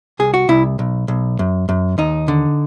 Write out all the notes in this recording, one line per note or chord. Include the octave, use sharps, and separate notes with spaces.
C2 G#4
F#4
C2 E4
B1
B1
F#2
F#2
D#2 D#4
D3